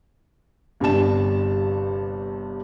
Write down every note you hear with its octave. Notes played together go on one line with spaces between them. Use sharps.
G1 G2 C3 G3 A5 E7